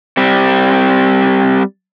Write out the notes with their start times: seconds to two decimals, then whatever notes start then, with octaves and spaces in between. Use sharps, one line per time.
0.17 G3 C4